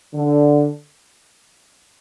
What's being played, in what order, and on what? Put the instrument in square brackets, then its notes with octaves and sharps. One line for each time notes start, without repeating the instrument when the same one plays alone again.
[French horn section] D3